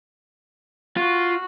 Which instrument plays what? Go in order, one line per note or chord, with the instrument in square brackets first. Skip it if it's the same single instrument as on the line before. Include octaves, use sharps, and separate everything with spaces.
[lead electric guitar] F4 [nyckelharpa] F#4